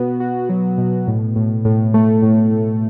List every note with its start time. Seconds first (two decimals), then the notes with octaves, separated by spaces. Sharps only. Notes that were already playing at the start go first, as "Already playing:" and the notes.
Already playing: B2 B3 F#4
0.20 F#4
0.49 F#3
0.78 B2
1.07 A2
1.36 A2
1.65 A2
1.94 A3
2.22 A2
2.51 A2